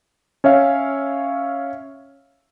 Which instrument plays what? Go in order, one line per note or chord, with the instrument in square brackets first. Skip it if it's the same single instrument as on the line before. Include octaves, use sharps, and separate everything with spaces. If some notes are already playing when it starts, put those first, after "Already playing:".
[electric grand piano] C#4 C#5 E5 F5